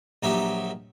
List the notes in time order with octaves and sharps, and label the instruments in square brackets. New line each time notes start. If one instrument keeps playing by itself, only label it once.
[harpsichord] A#1 F#3 D#4 G4 E5